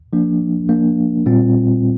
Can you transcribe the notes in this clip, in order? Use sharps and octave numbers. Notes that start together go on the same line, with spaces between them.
F3 A#3 D4
F3 A#3 D4
A#2 G3 C4 F4